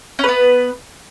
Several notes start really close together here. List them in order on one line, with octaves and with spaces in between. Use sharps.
C#4 B4 B3